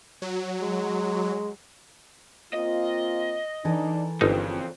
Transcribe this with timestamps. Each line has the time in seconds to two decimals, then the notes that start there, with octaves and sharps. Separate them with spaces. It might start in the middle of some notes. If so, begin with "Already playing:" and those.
0.22 F#3
0.62 G#3
2.53 A#3 C4 F4 D#5
3.65 E3 D4 D#4 A4 A#4
4.21 G1 F2 A#2 C#3 C4 D#4